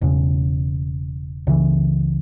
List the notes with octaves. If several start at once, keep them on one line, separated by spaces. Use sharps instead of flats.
E1 E2 C#3
C#2 C#3 E3